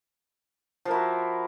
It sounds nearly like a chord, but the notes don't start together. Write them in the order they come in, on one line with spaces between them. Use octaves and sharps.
F3 A#4 E4 F#4